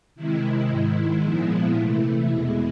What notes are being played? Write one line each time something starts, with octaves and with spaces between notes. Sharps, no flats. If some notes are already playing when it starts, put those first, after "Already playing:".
C3 D#3 G#3 E4
G#2 D#3 G#3
A#2 F3 G#3 B3
C3 E3 A3 E4
E2 B2 G#3